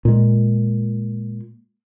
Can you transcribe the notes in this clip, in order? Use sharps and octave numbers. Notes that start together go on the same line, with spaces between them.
A#2 G#3